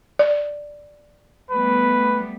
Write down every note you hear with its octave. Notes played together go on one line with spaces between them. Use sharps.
D5
G3 A3 B3 B4